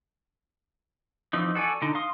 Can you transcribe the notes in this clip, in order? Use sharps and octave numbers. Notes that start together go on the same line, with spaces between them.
E3 F3 C4 D#4
F#4 A4 D5 G#5
D3 D#4
F5 C6 D#6